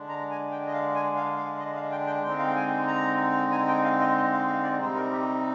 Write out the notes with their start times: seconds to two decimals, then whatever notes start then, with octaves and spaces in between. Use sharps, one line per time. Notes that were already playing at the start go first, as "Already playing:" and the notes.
Already playing: D3 G#3 D4
0.09 A#5
0.30 G#5
0.51 G5
0.67 D#5
0.73 F5
0.95 G#5
1.16 F5
1.37 F5
1.59 D#5
1.75 F5
1.91 G5
2.07 G5
2.23 D3 G#3 C4 D#4 G5
2.38 F5
2.47 G5
2.56 G#5
2.87 A#5
3.52 G#5
3.68 G5
3.84 F5
4.00 D#5
4.16 D#5
4.32 F5
4.48 F5
4.63 D5
4.80 C3 G3 C4 D#4 C5
4.96 A#4
5.12 G4